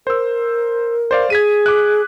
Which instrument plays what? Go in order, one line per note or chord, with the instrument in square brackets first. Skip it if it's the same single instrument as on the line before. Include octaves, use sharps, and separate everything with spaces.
[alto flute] A#4 [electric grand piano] C5 E6
[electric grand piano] C5 D5 F5
[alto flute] G#4 [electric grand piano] G#6 B6 D#7
[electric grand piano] D6 F#6